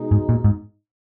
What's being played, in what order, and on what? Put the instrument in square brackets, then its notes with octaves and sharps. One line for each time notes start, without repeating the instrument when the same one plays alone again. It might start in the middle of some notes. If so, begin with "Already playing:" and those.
Already playing: [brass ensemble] B2 G#3 D#4
[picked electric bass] G#2
A#2
G#2